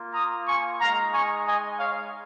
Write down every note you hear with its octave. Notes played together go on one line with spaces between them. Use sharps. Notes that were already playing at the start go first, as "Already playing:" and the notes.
Already playing: A#3 F4
A#5 D#6
G#5 C#6
G#3 D#4 F5 A#5
G#5 C#6
D#5 G#5
C#5 F5